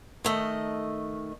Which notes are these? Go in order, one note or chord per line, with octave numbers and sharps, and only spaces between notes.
D#3 A3 D#5